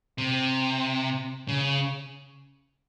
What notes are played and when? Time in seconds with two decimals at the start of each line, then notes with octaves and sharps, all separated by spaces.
0.18 C3
1.48 C#3